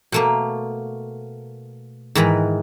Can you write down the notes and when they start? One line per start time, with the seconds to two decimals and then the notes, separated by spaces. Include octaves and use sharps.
0.12 B2 A3 A#3
2.15 G#2 D#3 E3 B4